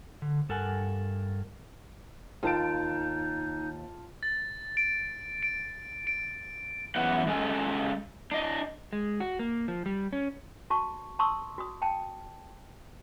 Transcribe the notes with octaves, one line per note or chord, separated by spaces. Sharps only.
D3
G2 A4 A#4 F#5 G#5
D#2 D#4 F4 A5 D7
A6
D7
D7
D7
F#2 E3 B3 F#5
G#3 C#4 A4 G#5
D4 D#5
G#3
F#4
A#3
F3
G3
C#4
F#4 A5 C#6
A5 C6 C#6 D#6 E6
F#4 D#6
G5 A5